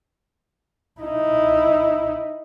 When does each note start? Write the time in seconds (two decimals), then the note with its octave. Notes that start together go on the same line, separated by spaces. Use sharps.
1.01 D#4 E4